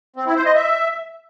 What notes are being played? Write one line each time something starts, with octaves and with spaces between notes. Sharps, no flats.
C4
E4
C5
D#5
E5